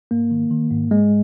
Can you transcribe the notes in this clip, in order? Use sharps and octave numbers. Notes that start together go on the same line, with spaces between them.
G#2 A#3
D#3
D#3
G#2
G#2 G#3